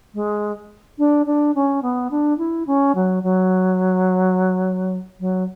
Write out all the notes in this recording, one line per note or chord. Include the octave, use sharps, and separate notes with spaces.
G#3
D4
D4
C#4
B3
D4
E4
C#4
F#3
F#3
F#3